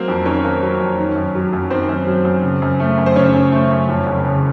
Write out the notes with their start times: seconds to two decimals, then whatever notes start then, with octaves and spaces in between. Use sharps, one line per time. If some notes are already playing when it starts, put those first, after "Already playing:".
Already playing: F#3 A#3 C4 C5
0.08 F2
0.25 D#3 C#4 C#5
0.44 A#3
0.63 F#3
0.80 F2
0.98 D#3
1.16 F#2
1.35 F#3
1.53 F#2
1.70 D#3 C4 C5
1.89 F#2
2.07 F#3
2.25 F#2
2.43 C#3
2.62 F#2
2.80 A3
2.98 F#2
3.06 C5
3.16 C#3 C#4 C#5
3.34 F#2
3.52 A3
3.71 F#2
3.89 F2
4.06 F#1
4.25 C#3